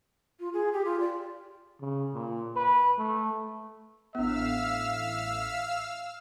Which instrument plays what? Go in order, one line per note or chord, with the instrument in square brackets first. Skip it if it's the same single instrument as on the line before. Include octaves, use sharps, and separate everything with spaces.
[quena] F4
G#4
G4
F4
D5
[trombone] C#3
A#2
B4
A3
[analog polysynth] A1 A2 [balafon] B3 D4 [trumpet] E5 [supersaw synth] F5 E6 F6